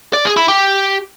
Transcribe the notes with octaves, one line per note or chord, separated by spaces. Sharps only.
D5
G#4
E4
G4